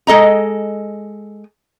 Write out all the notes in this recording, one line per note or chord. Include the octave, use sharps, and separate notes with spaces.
G#3 A4 D#5 A#5